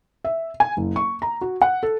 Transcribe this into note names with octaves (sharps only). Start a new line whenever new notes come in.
E5
G#5
F#1
C#6
A#5
F#4
F#5
A4